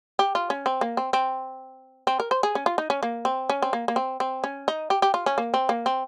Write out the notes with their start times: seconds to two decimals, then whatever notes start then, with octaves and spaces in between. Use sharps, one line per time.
0.19 G4
0.35 F4
0.50 C#4
0.66 C4
0.81 A#3
0.97 C4
1.13 C4
2.07 C4
2.20 A#4
2.31 C5
2.43 G#4
2.55 C#4
2.66 F4
2.78 D#4
2.90 C#4
3.03 A#3
3.25 C4
3.49 C#4
3.62 C4
3.73 A#3
3.88 A#3
3.96 C4
4.20 C4
4.44 C#4
4.68 D#4
4.90 G4
5.02 G4
5.14 F4
5.26 C#4
5.38 A#3
5.54 C4
5.69 A#3
5.86 C4